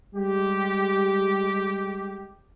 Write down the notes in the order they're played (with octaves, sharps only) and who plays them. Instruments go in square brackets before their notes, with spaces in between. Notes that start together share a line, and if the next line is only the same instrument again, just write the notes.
[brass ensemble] G3 G#3 G4